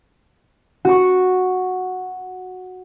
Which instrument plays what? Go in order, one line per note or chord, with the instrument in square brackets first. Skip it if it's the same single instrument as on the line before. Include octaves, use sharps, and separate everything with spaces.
[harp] F#4 C#6